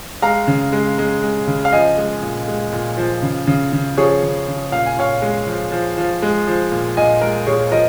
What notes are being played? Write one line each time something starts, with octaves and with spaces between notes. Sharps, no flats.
G#3 F5 A#5
C#3
G#3
G#3
G#3
C#3
F5
F3 D#5 G#5
G#3
A#2
G#3
A#2
F3
C#3
C#3
C#3
F3 G#4 C#5
C#3
C#3
A#2 F5
G#5
A#2 C#5 F5
G#3
F3
F3
F3
G#3
F3
A#2
A#2 D#5 G#5
G#3 A#4
A#2 G#4 C#5
F3 A#4 D#5